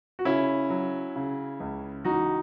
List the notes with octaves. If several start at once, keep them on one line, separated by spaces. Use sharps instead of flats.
F#4
C#3 C#4 E4
F#3
C#3
C#2
E3 D#4 F#4